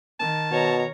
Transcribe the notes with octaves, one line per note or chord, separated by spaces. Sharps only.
D#3 A5
B2 C#5 A#5